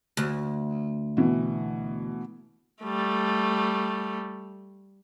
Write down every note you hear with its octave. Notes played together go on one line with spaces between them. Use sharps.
D2
B2 E3
G3 A3